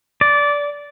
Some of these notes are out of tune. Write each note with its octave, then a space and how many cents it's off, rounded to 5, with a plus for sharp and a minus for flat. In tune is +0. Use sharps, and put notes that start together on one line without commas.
D5 -15